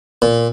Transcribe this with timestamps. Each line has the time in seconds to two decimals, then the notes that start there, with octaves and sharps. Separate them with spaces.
0.22 A#2